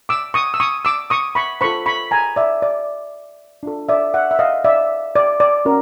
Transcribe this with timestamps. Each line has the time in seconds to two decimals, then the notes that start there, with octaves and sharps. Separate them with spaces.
0.09 D6 E6
0.34 C#6 D#6
0.54 E6
0.60 C#6 D#6
0.85 D6 E6
1.10 C#6 D#6
1.35 B5 C#6
1.61 F4 A4 C5 B5 C#6
1.86 B5 C#6
2.11 G#5 A#5
2.36 D5 E5
2.62 D5
3.63 D4 F4 A4
3.89 D5 E5
4.14 E5 F#5
4.31 E5
4.39 D#5 F5
4.64 D5 E5
5.16 D5
5.40 D5
5.65 C#4 F#4 A#4